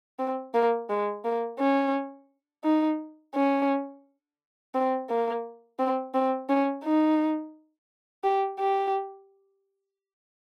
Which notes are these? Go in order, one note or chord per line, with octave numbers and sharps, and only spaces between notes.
C4
A#3
G#3
A#3
C#4
D#4
C#4
C4
A#3
C4
C4
C#4
D#4
G4
G4